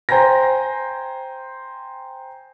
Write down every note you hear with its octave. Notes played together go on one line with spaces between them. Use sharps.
C5 G5 G#5 A#5 A#6